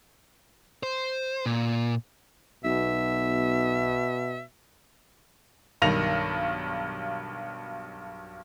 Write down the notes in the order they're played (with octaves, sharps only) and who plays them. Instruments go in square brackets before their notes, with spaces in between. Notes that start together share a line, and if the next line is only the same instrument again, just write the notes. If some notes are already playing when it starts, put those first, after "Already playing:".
[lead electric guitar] C5
A#2
[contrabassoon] B1 [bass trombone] B2 [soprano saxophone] E5
[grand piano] B1 G2 D#3 A#6 F7